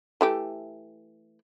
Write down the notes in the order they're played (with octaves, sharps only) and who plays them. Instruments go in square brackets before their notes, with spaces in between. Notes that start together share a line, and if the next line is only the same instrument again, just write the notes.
[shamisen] E3 A3 G4